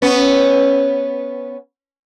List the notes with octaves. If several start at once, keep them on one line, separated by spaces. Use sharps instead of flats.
B3 C#4